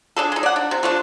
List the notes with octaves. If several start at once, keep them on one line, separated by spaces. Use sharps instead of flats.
D4 G#4 A4
G#3 D#4
D5 F#5
D4
C3
F3 A3 D4